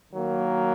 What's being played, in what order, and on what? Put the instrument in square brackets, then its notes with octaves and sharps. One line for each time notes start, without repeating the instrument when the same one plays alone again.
[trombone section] D#3 F#3 A#3